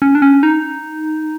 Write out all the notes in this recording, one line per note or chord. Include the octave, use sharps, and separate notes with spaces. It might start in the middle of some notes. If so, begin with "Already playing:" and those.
C#4
D4
C#4
D#4